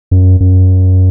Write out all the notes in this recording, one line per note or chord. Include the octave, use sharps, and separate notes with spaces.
F#2
F#2